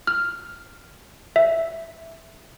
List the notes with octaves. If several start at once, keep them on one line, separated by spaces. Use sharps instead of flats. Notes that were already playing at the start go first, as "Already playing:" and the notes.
F6
E5